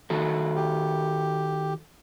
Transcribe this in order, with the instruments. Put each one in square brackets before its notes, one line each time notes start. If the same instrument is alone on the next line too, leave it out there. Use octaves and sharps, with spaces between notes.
[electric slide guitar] D#3 F#4 A4
[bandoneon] G4